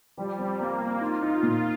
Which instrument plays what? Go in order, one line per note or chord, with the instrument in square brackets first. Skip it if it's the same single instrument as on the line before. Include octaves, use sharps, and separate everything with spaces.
[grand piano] F3 [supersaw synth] G3
[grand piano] C4
[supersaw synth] A#3 [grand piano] C4
[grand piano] C4
[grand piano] D#4 [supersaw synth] F4
[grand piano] D#4
A#2